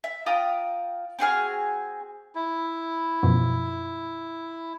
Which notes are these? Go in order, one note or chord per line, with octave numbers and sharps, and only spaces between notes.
E5
F4 G5 A#5 D#6
C4 F#4 G#4 F6
E4
F#2 B2 F3